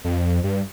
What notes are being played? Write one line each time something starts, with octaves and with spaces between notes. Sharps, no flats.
F2
G2